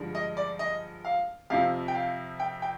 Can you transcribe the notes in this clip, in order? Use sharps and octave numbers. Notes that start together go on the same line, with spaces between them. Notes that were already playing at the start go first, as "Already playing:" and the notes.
Already playing: G2 D3 F3 G#3
D#5
D5
D#5
F5
F2 C3 F3 F5
G5
F5
G5
G5